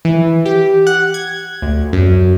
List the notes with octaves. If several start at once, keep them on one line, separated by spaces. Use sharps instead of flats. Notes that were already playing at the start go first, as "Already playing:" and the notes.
E3
G4
F#5
G#6
D2
F#2